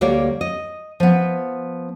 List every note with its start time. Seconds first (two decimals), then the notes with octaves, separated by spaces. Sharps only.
0.01 D2 G3 A#3 C#5 D5
0.41 D#5
1.00 F3 B3